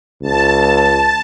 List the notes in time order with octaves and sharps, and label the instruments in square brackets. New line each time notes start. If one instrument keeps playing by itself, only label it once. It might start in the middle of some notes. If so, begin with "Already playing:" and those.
[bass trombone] C#2 [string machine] A5